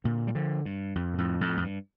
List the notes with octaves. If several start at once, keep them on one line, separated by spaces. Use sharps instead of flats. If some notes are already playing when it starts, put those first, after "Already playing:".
A#2 D3
G3
D3 F3
G2
F2
A#2
F2 A2
F2 A2
F2
G2